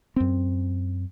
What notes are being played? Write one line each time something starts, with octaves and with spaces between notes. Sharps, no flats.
F#2 C4